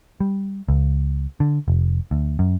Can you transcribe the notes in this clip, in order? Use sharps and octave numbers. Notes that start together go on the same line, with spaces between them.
G3
C#2
D3
F1
D2
F#2